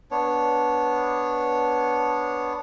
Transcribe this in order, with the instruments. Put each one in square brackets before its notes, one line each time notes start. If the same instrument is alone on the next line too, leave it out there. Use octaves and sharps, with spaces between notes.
[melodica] B3 D4 C#5